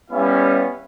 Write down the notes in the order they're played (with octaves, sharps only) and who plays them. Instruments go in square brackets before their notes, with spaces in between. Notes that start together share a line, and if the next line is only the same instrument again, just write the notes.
[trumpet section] G3 B3 C#4 E4 F5